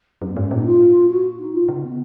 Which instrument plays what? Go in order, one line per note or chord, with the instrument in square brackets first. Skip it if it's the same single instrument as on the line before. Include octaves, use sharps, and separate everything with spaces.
[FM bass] F#2 [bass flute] C#4
[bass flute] B3
[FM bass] G#2 [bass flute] C#4
[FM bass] A#2 [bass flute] D#4
[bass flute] F4
F#4
D#4
F4
[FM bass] C#3
[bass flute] B3